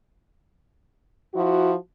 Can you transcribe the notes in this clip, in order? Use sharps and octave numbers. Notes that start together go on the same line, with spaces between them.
F3 E4 F#4